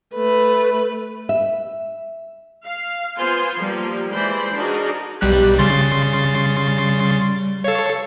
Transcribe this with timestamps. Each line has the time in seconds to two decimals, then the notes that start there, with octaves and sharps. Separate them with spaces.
0.15 A3 B4
1.29 E5
2.64 F5
3.18 B3 F4 C5 G#5 C6
3.57 F3 G3 A#3
4.11 E3 G#3 C5 D5 B5
4.56 D4 D#4 F#4 G#4 A#4
5.21 B1 G3 G4 F#6
5.58 C#3 G3 C6 A6
7.64 A4 C#5 F5